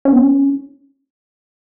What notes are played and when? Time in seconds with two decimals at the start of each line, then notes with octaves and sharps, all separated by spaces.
0.05 C#4
0.13 B3
0.21 C#4